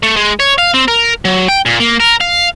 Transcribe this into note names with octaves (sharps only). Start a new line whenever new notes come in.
A3
G#3
C#5
F5
C4
A#4
F#3
G5
A#2
A#3
A#4
F5